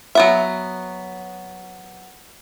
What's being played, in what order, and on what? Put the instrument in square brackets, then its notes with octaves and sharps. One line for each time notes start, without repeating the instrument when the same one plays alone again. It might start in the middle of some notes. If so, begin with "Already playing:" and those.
[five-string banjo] F#3 B3 E5